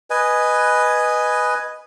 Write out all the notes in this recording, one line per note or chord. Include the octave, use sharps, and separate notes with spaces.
B4 D#5 G#5